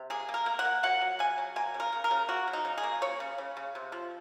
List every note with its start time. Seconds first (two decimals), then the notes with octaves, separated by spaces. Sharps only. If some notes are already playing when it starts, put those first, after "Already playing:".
Already playing: C3
0.10 A#3 G#4
0.29 A#3
0.34 A#4
0.46 A#3
0.59 F#5
0.65 A#3
0.83 F#3 F#5
1.01 F#3
1.19 C#3 G#5
1.38 F#3
1.56 A#3 G#5
1.74 C#3
1.80 A#4
1.93 C#3
2.04 A#4
2.11 C#3
2.28 A#3 F#4
2.48 F#3
2.53 D#4
2.65 C#3
2.78 G#4
2.84 A#3
3.02 C#3 C#5
3.20 C#3
3.38 C#3
3.57 C#3
3.75 C3
3.92 F3